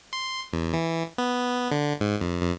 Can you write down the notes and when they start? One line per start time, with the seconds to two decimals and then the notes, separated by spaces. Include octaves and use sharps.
0.13 C6
0.53 E2
0.74 E3
1.18 B3
1.71 D3
2.00 G#2
2.21 F2
2.42 F2